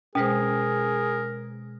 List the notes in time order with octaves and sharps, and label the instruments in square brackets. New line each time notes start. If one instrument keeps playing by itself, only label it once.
[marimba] B2 G#3 C5 [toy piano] C#4 [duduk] G#4 [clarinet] A#4